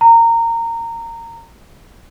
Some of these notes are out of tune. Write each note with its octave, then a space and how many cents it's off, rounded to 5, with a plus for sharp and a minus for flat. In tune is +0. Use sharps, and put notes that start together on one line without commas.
A#5 -20